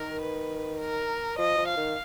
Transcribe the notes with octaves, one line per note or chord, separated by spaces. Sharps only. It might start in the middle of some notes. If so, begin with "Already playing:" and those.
Already playing: D#3 A#4
B4
A#4
F3 D#5
F3
F5
D#3